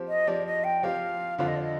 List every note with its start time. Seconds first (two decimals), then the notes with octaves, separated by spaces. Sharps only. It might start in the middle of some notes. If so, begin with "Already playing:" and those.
Already playing: F3 C4 G4
0.08 D#5
0.27 F3 C4 G4 D5
0.46 D#5
0.64 G5
0.83 F3 C4 G4 F5
1.38 F2 D3 F3 C4 F4 F5
1.47 D#5
1.56 D5
1.63 D#5